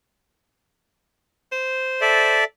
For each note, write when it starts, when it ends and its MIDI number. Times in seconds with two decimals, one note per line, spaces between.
1.52 2.40 72
2.01 2.44 69
2.01 2.44 74
2.01 2.44 76